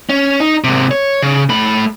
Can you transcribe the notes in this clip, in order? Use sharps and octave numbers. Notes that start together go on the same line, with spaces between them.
C#4
D#4
G#2 C3
C#5
C#3
A3 B5